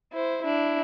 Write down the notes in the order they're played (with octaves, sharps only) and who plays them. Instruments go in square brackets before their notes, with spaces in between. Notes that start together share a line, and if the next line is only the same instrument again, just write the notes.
[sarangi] E4 [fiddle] C5
[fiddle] D4 [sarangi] E4